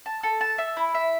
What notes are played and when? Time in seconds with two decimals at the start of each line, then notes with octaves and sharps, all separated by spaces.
0.06 A5
0.23 A4
0.41 A5
0.58 E5
0.77 E4
0.95 E5